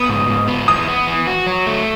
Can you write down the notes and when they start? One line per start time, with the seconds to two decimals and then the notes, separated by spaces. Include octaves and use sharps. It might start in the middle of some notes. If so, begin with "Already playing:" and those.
Already playing: B3 D#6
0.09 G#2
0.29 G#2
0.48 B3
0.68 E3 D#6
0.88 B3
1.07 E3
1.27 F#4
1.47 F#3
1.67 A3